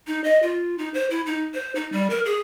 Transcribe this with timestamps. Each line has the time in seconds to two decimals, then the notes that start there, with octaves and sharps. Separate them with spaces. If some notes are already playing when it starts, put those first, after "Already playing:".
0.07 D#4
0.24 D#5
0.42 F4
0.78 D#4
0.94 C5
1.10 E4
1.26 D#4
1.54 C5
1.75 D#4
1.92 G3
2.10 A#4
2.26 G#4